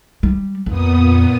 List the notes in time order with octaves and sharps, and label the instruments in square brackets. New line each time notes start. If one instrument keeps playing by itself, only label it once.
[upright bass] G3
[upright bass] F2 [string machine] A#2 B3 D#6